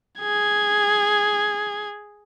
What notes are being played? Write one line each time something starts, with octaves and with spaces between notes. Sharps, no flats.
G#4 G#6